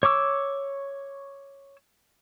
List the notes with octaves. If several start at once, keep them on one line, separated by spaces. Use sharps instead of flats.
C#5 C#6 D6 E6